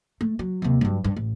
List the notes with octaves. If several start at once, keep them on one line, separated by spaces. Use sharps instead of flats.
A3
F#3
D#2 C3
G2 F#3
G2
A1